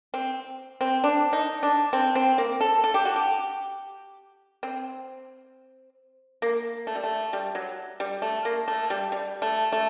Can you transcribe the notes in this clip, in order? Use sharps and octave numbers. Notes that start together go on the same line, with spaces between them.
C4
C4
D4
D#4
D4
C4
C4
A#3
A4
A4
G4
F#4
G4
C4
A#3
A3
G3
A3
G3
F#3
G3
A3
A#3
A3
G3
G3
A3
A3